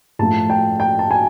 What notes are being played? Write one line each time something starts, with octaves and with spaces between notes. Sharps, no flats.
A2 F3 A3 A5
G5
G5
A5
G#5